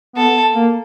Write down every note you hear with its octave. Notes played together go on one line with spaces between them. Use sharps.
B3 A4
A#3